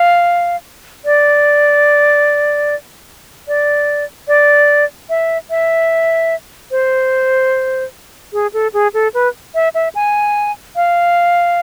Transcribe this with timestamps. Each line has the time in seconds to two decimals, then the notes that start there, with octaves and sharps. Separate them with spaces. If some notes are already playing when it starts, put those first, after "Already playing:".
Already playing: F5
1.05 D5
3.48 D5
4.28 D5
5.09 E5
5.50 E5
6.71 C5
8.33 G#4
8.53 A4
8.74 G#4
8.94 A4
9.14 B4
9.55 E5
9.74 E5
9.95 G#5
10.76 F5